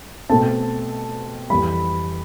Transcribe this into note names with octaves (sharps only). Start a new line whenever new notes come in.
B2 A3 C4 A5
F2 E3 G3 B5